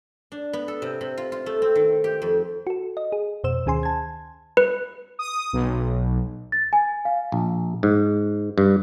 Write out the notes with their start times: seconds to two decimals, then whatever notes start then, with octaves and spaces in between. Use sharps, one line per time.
0.32 D4
0.53 B3
0.68 A4
0.82 C3
1.01 C3
1.17 F4
1.32 F4
1.46 A3
1.62 C4
1.75 D#3
2.04 G4
2.22 F2
2.67 F#4 A4
2.97 D#5
3.12 G#4
3.44 F2 B2 C5 E6 E7
3.66 D2 D#3 C#4 G#4 G#5 C6
3.83 A5 G#6
4.57 B4
5.19 D#6
5.53 B1
6.52 A6
6.73 G#5
7.05 F5
7.32 A#1
7.83 G#2
8.58 G2